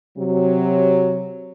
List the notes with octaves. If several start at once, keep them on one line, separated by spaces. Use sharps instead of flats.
C3 F#3